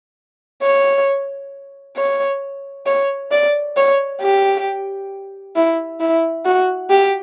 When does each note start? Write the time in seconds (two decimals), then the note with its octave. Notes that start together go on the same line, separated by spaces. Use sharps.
0.62 C#5
1.97 C#5
2.86 C#5
3.31 D5
3.77 C#5
4.21 G4
5.56 E4
6.00 E4
6.45 F#4
6.90 G4